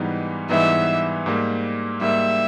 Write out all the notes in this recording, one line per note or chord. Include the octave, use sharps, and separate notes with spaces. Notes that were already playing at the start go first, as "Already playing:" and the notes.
Already playing: G#2 E3 G3 B3 D#4
G#2 E3 G3 B3 D#4 E5
G#2 G3 A#3
G#2 G3 A#3 E5